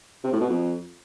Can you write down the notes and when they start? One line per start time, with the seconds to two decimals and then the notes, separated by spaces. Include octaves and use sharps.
0.24 C3
0.32 A2
0.41 B2
0.49 F2